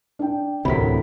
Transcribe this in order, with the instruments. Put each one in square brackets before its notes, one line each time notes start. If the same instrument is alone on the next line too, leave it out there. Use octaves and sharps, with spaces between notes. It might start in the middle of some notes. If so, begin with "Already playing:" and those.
[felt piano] D4 G5
[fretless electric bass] D2 C3 [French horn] A2 [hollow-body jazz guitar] E3 F#4 A#4 [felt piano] B5 B6